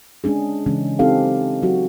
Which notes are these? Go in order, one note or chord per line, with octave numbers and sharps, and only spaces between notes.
G#3 C#4 D4 G#4
C#3 E3 G#3 C#4
F#3 C4 D#4 G4 A4 F5
F#3 F#4